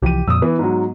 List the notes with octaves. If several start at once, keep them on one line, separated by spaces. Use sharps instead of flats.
C2 E3 F3 G4 D#7
F2 A#2 D#6 E6
E3 B3
G#2 F#3